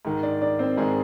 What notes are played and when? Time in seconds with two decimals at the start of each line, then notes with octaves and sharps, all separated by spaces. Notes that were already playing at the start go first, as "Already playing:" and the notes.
0.05 G#2 D#3
0.23 D4 D5
0.42 D4 D5
0.59 C4 C5
0.77 G#2 D#3 G#3 G#4